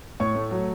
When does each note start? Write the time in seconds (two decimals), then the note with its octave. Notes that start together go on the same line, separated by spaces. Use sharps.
0.20 A2 C#5 C#6
0.35 A3
0.51 F#3